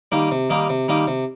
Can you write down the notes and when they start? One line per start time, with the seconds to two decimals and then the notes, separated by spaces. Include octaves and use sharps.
0.12 D#3 G3 A#3 D#4
0.31 C3
0.50 D#3 G3 A#3 D#4
0.69 C3
0.88 D#3 G3 A#3 D#4
1.07 C3